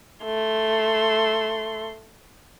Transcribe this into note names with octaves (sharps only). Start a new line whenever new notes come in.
A3 C6